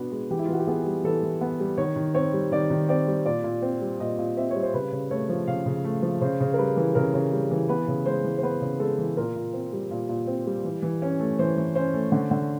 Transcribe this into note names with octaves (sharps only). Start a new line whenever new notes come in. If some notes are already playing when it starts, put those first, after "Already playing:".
Already playing: B2 B3 D4
G#3
E3 G4
E4
F4
E3 F#4
G4
B3 G#4
G3
E3 A4
E3
B3
G3
D#3 C#5
D#3
C4 C#5
G3
D#3 D5
D#3
C4 D5
G3
A#2 D5
A#2
C4
G3
A#2 D#5
A#2
C4 E5
G3 C#5
C5
C#3 B4
C#3
A3 C#5
F3
C#3 F5
C#3
A3
F3
C#3 C5
C#3
A#4
G3 B4
E3
C#3 A#4
C#3
G3
E3
B3 B4
C#3
G#3 C5
E3
C5
B3 B4
C#3
G#3 A4
E3
A#2 A#4
A#2
C4
G3
A#2
A#2
C4
G3
E3
E3
C#4
A3
E3 C5
E3
C#4 C5
A3
D3
D3